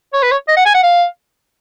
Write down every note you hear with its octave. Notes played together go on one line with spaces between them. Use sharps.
C#5
B4
C#5
D#5
F#5
G#5
F#5
F5